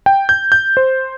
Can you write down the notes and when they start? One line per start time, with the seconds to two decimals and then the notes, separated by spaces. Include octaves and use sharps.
0.06 G5
0.29 G6
0.52 G6
0.77 C5